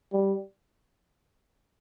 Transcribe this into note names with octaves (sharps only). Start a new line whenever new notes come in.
G3